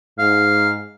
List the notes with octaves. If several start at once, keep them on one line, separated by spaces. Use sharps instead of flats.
G#2 F5